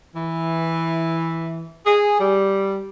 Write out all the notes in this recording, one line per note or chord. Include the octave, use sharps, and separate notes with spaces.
E3
G#4
G3